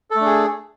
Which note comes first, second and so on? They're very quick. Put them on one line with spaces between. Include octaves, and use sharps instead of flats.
A4 A3 D4 G#4